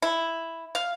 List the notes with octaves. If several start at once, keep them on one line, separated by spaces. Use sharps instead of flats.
E4
F5